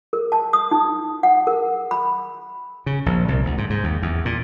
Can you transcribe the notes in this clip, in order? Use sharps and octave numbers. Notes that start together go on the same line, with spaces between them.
A#4
A5
D#6
D#4
F#5
A#4
B5
C#3
A#1
C2
D2
G#2
G#2
D#2
E2
A#2